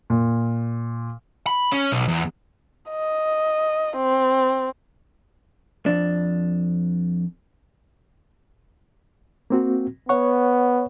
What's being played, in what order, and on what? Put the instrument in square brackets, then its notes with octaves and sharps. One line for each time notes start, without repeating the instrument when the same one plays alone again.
[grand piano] A#2
[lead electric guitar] B5
C#4
B1
E2
[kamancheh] D#5
C4
[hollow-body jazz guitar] F2 D4
[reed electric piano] A#3 C4 F#4
[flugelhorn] B3 [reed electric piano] C#5 F#5 C#6